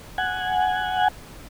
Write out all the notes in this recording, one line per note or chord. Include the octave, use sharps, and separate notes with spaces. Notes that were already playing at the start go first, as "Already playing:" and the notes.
F#5 G#5